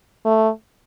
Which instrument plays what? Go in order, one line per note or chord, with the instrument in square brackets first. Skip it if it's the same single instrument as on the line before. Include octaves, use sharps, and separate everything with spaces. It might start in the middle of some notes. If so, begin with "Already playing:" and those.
[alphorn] A3